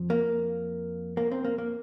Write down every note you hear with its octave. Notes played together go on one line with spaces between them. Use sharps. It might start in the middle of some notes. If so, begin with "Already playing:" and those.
Already playing: F2 F3
A#3
A#3
C4
A#3
A#3